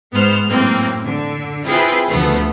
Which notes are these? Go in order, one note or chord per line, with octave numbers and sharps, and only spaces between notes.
G#2 B3 C5 F6
F#2 A2 A#3 C4
D3
C4 E4 F4 G#4 B4 G5
D2 F3 A3 B3